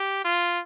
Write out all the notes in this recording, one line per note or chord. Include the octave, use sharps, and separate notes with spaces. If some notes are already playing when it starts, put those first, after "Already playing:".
Already playing: G4
F4